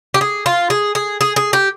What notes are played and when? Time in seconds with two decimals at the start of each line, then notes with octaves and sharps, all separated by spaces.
0.14 G4
0.21 G#4
0.46 F4
0.70 G#4
0.95 G#4
1.21 G#4
1.36 G#4
1.53 G4